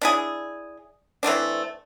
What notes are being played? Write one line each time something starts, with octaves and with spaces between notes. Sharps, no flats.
D4 E4 G#4
E3 A3 C4 D4